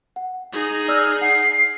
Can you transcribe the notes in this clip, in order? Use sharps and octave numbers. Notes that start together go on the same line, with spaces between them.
F#5
D#4 G#4
D5 E6 F6
F#5 C7